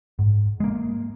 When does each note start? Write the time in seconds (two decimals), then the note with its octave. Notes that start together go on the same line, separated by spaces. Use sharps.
0.19 G#2
0.60 G#3 A#3